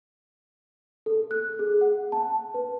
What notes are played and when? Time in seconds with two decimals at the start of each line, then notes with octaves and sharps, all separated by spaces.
1.06 A4
1.31 F#6
1.59 G#4
1.81 F#5
2.12 A5
2.54 B4